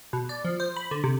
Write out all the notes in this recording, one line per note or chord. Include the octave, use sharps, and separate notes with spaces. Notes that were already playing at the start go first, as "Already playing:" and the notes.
B2
D5
F3
C5
B5
D3
C3